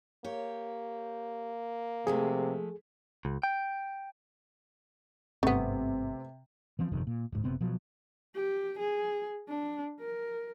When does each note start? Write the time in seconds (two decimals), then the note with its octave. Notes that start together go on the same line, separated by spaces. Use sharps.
0.24 A#3 G4 C#5
2.07 C3 F3 G#3 A3 G#4
3.25 C#2
3.43 G5
5.43 G#1 G2 C3 A3 B3
6.79 E3 F3 C4
6.92 G1 F2 C3 D#3
7.07 A#2
7.32 D1 G#2
7.44 F#1 C3 B3 C4
7.61 B2 F3 F#3
8.35 G4
8.79 G#4
9.48 D4
10.00 A#4